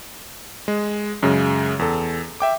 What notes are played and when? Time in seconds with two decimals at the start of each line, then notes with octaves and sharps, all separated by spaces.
0.68 G#3
1.23 F#2 C#3 G#3
1.79 E2 A4
2.40 E5 G5 D6